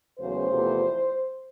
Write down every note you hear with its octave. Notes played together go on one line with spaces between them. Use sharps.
E2 C#3 F#3 A3 C5
E2 C3 F3 A3